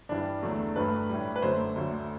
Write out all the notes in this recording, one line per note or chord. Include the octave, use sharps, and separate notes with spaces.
G2 E3 G3 D4
E2 D3 F#3 A3
G2 F#3 A3 B4
A2 G3
B4
F#2 D3 F#3 A3 C5
D2 D3 F#3 A3